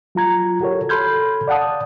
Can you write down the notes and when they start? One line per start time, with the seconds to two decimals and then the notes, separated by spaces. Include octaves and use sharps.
0.15 F#3 F4 A#5 G#6
0.61 F#4 G4 A4 A#4 C#5
0.89 A4 B5 C6 F6 G6 G#6
1.48 D5 F5 F#5 A5 D#6